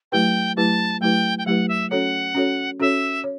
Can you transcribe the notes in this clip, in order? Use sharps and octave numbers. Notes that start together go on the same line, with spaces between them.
F#3 A3 E4 G4 B4 G5
F#3 A3 E4 G4 B4 A5
F#3 A3 E4 G4 B4 G5
G5
F#3 A3 E4 G4 B4 F#5
E5
C#4 F#4 A4 C#5 F#5
C#4 F#4 A4 C#5
C#4 F#4 A4 C#5 E5
C#5